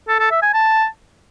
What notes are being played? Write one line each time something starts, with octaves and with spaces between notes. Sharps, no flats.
A4
A4
E5
G#5
A5